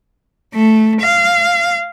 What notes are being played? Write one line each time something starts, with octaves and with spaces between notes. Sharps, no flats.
A3
F5